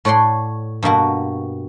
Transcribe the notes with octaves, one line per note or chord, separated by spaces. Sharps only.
A2 C#5 D5 F#5 C6
G2 B2 A#3 F#4